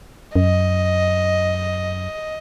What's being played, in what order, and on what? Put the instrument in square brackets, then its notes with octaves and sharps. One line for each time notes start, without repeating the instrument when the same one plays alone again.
[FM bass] F#2 [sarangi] D#5